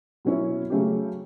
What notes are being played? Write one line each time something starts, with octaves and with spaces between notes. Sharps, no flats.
B2 F#3 C#4 E4
C#3 F#3 A3 C#4 G4